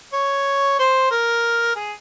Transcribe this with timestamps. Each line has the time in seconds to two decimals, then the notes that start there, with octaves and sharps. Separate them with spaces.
0.13 C#5
0.79 C5
1.11 A#4
1.76 G#4